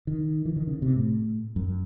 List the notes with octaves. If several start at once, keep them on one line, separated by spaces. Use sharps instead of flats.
D#3
E3
D#3
C#3
C3
A2
F#2